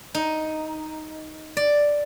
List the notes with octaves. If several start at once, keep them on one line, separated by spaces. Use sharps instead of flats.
D#4
D5